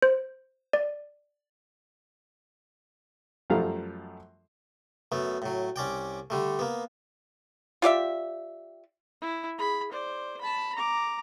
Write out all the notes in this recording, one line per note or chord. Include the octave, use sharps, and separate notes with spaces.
C5
D5
F#2 F3 G3 A3 F5 A#5
F#2 A3 B3
A2 F#3
C2 C#4 D5 G5
D3 G3 A3
A#3 B3
F4 G4 D5 E5
E4
G#4 B5
C5 D5
A5 B5
A#5 D6